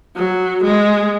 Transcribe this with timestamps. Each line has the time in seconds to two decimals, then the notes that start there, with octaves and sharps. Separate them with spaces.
0.17 F#3
0.64 G#3